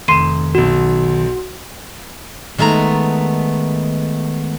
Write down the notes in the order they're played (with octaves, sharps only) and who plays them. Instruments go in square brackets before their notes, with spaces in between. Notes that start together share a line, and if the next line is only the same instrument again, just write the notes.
[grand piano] F1 E7 [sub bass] D#3 [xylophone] C6 C7 D#7
[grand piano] B1 E7 [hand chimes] F#4
[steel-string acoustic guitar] D#3 G#3 A3 B3 A#5